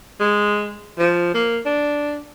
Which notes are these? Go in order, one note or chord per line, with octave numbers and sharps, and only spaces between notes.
G#3
F3
A#3
D4